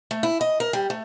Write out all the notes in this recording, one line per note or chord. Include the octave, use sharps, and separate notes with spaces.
A3
E4
D#5
A#4
G3
A3